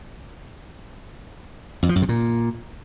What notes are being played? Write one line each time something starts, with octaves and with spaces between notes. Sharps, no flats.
F2
F3
F#2
C3
A#2